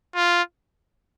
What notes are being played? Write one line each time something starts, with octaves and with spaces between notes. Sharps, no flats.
F4